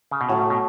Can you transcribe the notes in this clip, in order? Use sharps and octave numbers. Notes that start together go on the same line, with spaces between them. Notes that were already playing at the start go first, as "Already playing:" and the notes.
C#3
B2
A2 F#3 A3 C#4 F#4
B2